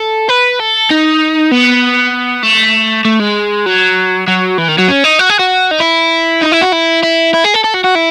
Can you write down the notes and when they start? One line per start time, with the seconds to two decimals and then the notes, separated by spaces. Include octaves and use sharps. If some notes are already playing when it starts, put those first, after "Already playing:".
Already playing: A4
0.29 B4
0.60 A4
0.90 D#4
1.51 B3
2.43 A3
3.05 A3
3.20 G#3
3.66 F#3
4.28 F#3
4.58 E3
4.68 D#3
4.78 F#3
4.88 C#4
5.04 D#4
5.19 F#4
5.29 G#4
5.39 F#4
5.71 D#4
5.80 E4
6.41 D#4
6.52 E4
6.61 F#4
6.72 E4
7.03 E4
7.33 E4
7.44 G#4
7.54 A4
7.64 A4
7.74 F#4
7.84 F#4
7.95 E4